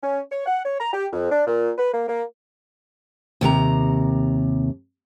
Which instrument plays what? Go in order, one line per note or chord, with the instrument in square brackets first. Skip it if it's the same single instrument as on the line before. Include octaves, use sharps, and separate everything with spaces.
[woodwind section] C#4
C#5
F#5
C#5
A#5
G4
F2
D4
A#2
B4
A#3
A#3
[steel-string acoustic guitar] D#2 C3 A#4 A#5